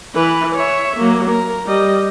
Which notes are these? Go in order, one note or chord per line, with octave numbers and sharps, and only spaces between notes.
E3 B4
C#5 E5
F#3 A#3
A#4
G3 D#5